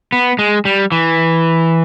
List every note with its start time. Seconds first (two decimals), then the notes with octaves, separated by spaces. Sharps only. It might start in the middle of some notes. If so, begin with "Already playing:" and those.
0.12 B3
0.39 G#3
0.65 G3
0.92 E3